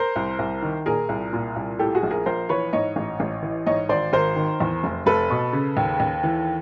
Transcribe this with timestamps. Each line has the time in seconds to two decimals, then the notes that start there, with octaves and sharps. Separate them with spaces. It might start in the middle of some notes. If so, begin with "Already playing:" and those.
Already playing: A#4 C5
0.16 C2
0.39 C2
0.62 D#3
0.86 A#2 G#4 A#4
1.09 C2
1.33 A#2
1.56 C2
1.79 A2 G4 A4
1.95 F#4 G#4
2.03 A#1
2.11 G#4 A#4
2.26 A#1 A#4 C5
2.49 E3 B4 C#5
2.73 G#2 C#5 D#5
2.96 A1
3.20 A1
3.42 E3
3.66 G#2 C#5 D#5
3.89 G#1 C5 D5
4.13 G#1 A#4 C5
4.36 D#3
4.60 E2
4.83 F1
5.06 F1 A4 B4
5.30 B2
5.53 C#3
5.77 D#2
6.00 D#2
6.23 E3